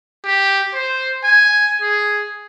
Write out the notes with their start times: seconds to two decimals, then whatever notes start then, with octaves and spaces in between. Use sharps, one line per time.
0.24 G4
0.74 C5
1.24 G#5
1.82 G#4